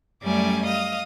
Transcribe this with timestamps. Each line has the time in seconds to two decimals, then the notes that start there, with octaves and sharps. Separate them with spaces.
0.23 F#2 G3 A3 C#4 D5 G#5
0.65 D#5 F5 D#6